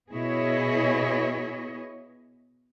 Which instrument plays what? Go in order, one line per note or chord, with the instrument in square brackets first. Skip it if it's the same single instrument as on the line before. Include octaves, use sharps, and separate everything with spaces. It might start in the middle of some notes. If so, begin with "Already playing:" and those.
[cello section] B2 B3 E4 G#4 C#5 D#5